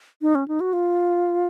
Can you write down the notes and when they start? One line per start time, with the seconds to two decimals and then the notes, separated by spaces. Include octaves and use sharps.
0.22 D#4
0.35 C#4
0.48 D#4
0.60 F#4
0.73 F4